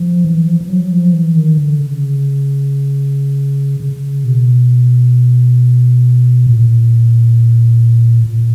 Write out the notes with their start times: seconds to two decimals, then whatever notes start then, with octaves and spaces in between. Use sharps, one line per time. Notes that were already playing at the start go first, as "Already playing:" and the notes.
Already playing: F3
0.25 E3
0.46 F3
0.61 F3
0.68 F#3
0.91 F3
1.13 E3
1.36 D#3
1.57 D3
1.80 C#3
3.80 C#3
4.24 B2
6.47 A#2
8.24 A#2